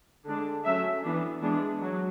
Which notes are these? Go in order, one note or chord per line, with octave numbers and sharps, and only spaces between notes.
D3 G#3 D4
F#3 A3 C#4 E5
E3 B3 D4
E3 G#3 B3 D4
F#3